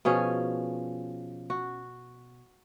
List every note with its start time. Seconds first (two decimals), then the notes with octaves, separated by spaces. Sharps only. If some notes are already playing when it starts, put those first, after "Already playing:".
0.05 B2 F3 C#4 G#4
1.50 F#4